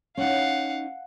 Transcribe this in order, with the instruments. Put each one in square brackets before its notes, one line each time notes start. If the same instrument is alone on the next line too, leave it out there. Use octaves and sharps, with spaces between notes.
[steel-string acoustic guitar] C#4 D#4 [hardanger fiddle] F5 F#5